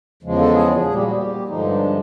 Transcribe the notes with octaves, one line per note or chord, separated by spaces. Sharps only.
E2 C#3 F3 G#3
A4
G#4
A#2 G3 G#4
G4
F#4
G4
G2 D3 F3 G#3 D#4
D4
C4